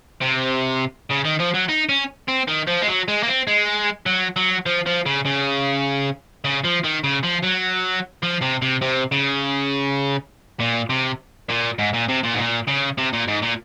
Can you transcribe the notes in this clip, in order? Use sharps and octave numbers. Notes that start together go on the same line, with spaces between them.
C3
C#3
D#3
F3
F#3
D#4
C#4
C4
D#3
F3
G#3
F#3
G#3
A#3
C4
G#3
F#3
F#3
F3
F3
C#3
C#3
C#3
F3
D#3
C#3
F3
F#3
F3
C3
C3
C3
C#3
A#2
C3
A#2
G#2
A#2
C3
A#2
G#2
A#2
C#3
C3
A#2
G#2
A#2